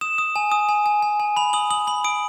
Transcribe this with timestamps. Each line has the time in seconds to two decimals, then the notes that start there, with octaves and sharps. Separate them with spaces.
0.01 D#6 E7
0.18 D#6
0.36 G#5
0.52 D#6
0.69 G#5
0.86 G#5
1.03 G#5
1.20 G#5
1.36 B5 F7
1.53 D#6 F#7
1.71 D#6 F#7
1.87 B5 F#7
2.04 D#6 D7